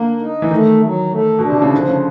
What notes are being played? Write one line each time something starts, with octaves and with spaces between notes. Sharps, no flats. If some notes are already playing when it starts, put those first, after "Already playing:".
Already playing: D3 A#3
D#4
E3
D#3 A3
F#3
A3
B2 D4
C3
C#3
D3 F3
C#3